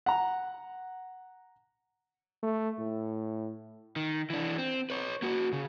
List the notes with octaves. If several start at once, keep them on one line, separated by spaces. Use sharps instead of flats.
F#5 A#5
A3
A2
D#3
E3 D4
C4
B4 C#5
A#3 F#4
C#3